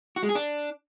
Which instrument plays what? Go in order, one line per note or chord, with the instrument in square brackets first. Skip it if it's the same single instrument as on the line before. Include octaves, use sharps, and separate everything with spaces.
[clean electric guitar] F#4
G#3
G#4
D4